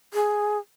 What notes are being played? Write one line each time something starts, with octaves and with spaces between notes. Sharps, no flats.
G#4